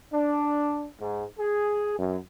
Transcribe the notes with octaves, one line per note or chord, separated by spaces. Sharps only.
D4
G#2
G#4
F#2